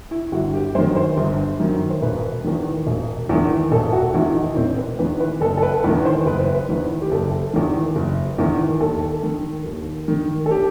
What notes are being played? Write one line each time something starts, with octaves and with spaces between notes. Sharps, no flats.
E4
G1 F#4
G4
F#2 D#3 C5
C5
G1
F#2 D#3
C5
E1 B4
E2 D#3
E1
E2 D#3
E1 A4
F#4
E2 D#3 E4
E4
D#4
E1 C4
B4
E2 D#3 B4
B4
F#1 A4
A4
B4
E2 D#3 B4
C5
F#1 B4
C5
B4
E2 D#3
G4
F#1 A4
E2 D#3
F#1
E2 D#3
D#2 A4
D#3
D#2
D#3
A4
G4